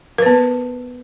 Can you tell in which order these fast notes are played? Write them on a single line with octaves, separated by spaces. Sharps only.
A#4 B4 B3